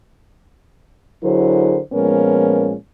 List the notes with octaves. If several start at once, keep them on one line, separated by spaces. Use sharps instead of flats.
D3 F#3 E4 G#4 A#4 C5
A#2 F3 G#3 B3 C#4 A#4